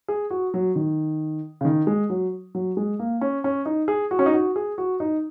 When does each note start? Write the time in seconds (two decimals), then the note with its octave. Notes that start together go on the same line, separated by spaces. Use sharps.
0.08 G#4
0.30 F#4
0.54 F#3
0.76 D#3
1.61 C#3
1.65 D#3
1.87 G#3
2.10 F#3
2.55 F#3
2.77 G#3
2.99 A#3
3.21 C#4
3.44 C#4
3.66 D#4
3.88 G#4
4.11 F#4
4.19 C#4
4.26 D#4
4.34 F#4
4.56 G#4
4.78 F#4
5.00 D#4